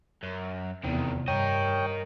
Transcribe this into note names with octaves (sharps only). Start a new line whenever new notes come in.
F#2
F1 E2 C3 D#3
G2 A#4 C#5 D#5 G5